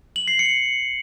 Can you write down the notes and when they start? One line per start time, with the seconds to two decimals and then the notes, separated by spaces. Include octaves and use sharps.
0.16 F#7
0.28 C7
0.39 C#7